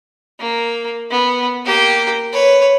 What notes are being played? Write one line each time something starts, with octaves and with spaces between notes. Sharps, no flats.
A#3
B3
A#3 G4
B4 C#5